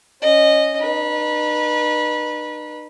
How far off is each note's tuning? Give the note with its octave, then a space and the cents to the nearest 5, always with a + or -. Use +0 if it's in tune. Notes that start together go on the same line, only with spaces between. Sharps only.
C#4 +0 D#5 -15
D#4 -40 B4 -25